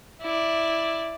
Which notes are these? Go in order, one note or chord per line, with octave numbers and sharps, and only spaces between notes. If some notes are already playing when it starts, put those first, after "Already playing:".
E4 D5